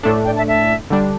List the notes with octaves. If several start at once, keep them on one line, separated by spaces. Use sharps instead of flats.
A2 A3 D4 A4
D5 G5
E5 A5
E5 A5
D3 G3 D4